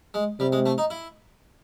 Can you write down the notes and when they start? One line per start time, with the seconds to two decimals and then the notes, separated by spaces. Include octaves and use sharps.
0.14 G#3
0.39 C3 G3
0.52 G#3
0.66 A3
0.78 D#4
0.90 E4